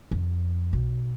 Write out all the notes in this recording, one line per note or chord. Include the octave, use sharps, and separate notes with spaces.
F2
B1